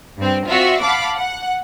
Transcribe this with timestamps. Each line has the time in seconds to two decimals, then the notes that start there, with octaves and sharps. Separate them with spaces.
0.18 G2 C4
0.47 C4 F4 F#4 D5 E5
0.81 F5 F#5 A5 B5 D6
1.14 F#5